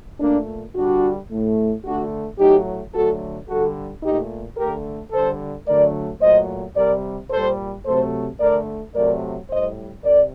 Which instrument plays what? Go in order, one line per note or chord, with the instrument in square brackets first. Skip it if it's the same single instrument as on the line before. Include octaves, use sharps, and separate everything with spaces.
[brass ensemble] A#2 A3 A#3 D4
D3 G3 D4 F#4
A2 A3
D3 A3 D4 F#4
A2 F#3 A3 D#4 G4
D3 F#3 A3 F#4 A4
D3 G3 F#4 A4
A#2 A3 D#4 G4
D3 A3 G4 A#4
D3 G3 A4 C5
D3 F#3 A3 A#4 D5
A#2 F#3 A3 C5 D#5
C3 G3 A#4 D5
A#2 G3 A4 C5
C3 F#3 A3 A4 C5
D3 A3 A#4 D5
C3 F#3 A3 A#4 D5
A2 G3 C5 D#5
C3 A#4 D5